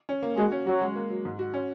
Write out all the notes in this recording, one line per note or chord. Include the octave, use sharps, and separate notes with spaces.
C#4
A#3
G#3 F#4
C#4
F#3 F#4
G#3
A#3
F#3
G#2
F#4
C#4